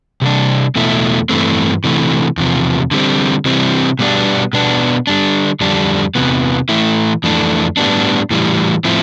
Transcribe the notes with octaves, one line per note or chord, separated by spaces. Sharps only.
C3 G3 D4
E2 B2 A3 E4
G2 E3 A3 C4
C3 E3 A3
E2 C3 F3
D3 G3 C4
C3 E3 G3 C4
B2 G3 B3 D4
B2 B3 D4
D3 G3 D4
F2 D3 G3 D4
E2 C3 E3 B3
A2 E3 A3 E4
F2 E3 A3 D4
A2 G3 B3 D4
A2 E3 G3
A2 F3 C4 E4